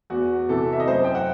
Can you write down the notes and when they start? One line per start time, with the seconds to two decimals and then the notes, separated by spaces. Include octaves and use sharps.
0.10 E2 F#4
0.49 C3 E3 A4
0.73 E5
0.80 D#5
0.87 F#2 C5
1.04 G5
1.15 F#5